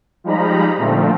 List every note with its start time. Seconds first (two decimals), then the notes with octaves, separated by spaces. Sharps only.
0.24 F3 G3 G#3 D#4 A#5 B5
0.78 A#2 D3 F3 A3 C4